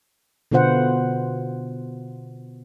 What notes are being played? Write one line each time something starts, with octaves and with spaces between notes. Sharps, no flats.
B2 D3 B3 F4 C5 F#5